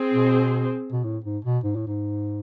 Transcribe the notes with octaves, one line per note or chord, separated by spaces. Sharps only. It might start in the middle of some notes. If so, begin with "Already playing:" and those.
Already playing: C4 G#4 C5
B2
B2
A2
G#2
B2
G#2
A2
G#2